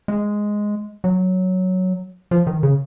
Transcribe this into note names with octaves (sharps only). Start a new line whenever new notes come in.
G#3
F#3
F3
D#3
C#3